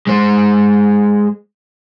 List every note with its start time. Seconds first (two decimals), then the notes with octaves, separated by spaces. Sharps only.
0.07 G#3 C5